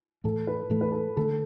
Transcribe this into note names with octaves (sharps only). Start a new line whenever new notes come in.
A2 E3 A3 A4
B4
A2 E3 A3 A4
B4
A4
D3 A3 D4 A4